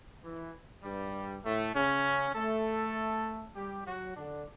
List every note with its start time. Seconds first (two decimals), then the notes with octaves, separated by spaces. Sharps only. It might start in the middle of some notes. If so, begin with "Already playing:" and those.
0.24 E3
0.84 G2 G3
1.45 A2 A3
1.75 C#3 C#4
2.35 A3 A4
3.56 G3 G4
3.86 F#3 F#4
4.17 D3 D4